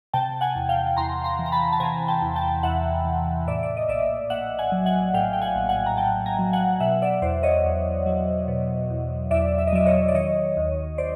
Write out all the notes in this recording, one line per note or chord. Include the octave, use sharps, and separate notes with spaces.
C3 G5 A5
F#5 G#5
E2
F5 G5
E2 A#5 C6
A#5 C6
E3
A#5
A5 B5
A5
C3 G#5 A#5
G5 A5
E2
G5 A5
E2 E5 F#5
E3
A2 D5 E5
D5
D#5
A#1 D5 E5
A#1 E5 F#5
F#5 G#5
F#3
F#5 G#5
A2 F5 G5
G5
F#5 G#5
A#1
F#5 G#5
A#5
A#1 G5 A5
G#5 A#5
F#3
F#5 G#5
B2 E5 F#5
D5 E5
E2 C5 D5
C#5 D#5
E2
F#3
B2
E2
E2 D5 E5
E5
D#5
F#3 D5 E5
C#5 D#5
D5
D#3 C#5 D#5
D#2
C5 D5